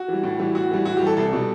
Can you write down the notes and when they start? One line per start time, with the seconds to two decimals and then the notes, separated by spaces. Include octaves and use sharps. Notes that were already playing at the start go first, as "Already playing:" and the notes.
Already playing: F#4
0.08 E3 G3
0.23 A2
0.39 E3 G3
0.55 A2 F#4
0.71 E3 G3
0.85 A2 F#4
0.97 G4
1.02 E3 G3 A4
1.17 C2 A4
1.32 B2 G3